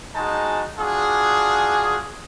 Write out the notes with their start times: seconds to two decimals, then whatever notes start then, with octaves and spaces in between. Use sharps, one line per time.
0.16 G#3 D#4 F#4 G#4 A5
0.79 D4 F4 F#4 G#4